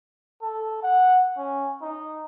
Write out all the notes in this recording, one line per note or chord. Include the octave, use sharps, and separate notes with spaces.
A4
F#5
C#4
D#4